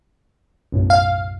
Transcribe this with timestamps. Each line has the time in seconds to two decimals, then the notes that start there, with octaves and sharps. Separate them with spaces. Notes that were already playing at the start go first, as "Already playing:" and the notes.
0.72 B1 F#2 A2
0.90 F5